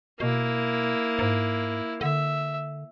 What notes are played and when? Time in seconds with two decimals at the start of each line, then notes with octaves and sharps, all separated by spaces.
0.20 B2 A#3 E4
1.19 G#2
2.01 D3 E5